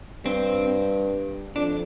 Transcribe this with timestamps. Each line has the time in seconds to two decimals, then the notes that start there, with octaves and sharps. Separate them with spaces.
0.25 G2 C4
1.56 F2 D4